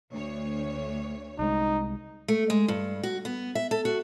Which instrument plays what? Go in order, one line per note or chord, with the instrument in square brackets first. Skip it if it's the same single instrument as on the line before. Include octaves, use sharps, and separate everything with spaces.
[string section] D2 C#5
[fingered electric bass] C2 G#3 [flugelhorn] D#4
[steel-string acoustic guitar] A3
G#3
G2
F#4
B3
E5
A4
F#4